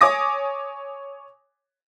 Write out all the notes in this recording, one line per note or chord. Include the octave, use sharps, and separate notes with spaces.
C#5 G#5 D6 D#6 A#6